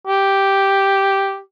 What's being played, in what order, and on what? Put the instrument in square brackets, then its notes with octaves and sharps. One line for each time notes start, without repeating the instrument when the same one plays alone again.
[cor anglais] G4